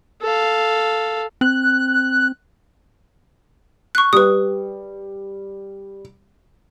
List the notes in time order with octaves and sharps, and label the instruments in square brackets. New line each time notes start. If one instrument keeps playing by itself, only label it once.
[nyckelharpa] A4 F5
[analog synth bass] C4 [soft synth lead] F#6
[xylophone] C#6 F#6
[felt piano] G3 [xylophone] B4 D#6